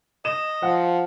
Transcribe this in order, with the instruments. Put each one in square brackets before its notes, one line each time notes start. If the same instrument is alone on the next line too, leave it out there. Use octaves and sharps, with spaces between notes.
[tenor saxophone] D#5 [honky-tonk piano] E7
[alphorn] F3 [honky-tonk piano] F#5